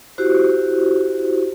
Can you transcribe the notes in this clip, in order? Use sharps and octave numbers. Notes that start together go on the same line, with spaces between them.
E4 F#4 G4 C5